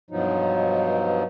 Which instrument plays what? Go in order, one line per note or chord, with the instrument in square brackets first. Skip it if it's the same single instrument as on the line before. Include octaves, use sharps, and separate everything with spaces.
[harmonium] G2 B2 F3 F#3 D#4